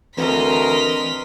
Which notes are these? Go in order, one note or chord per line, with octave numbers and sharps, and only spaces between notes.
D2 E3 C4 A#4 B4 D#5 C6 B6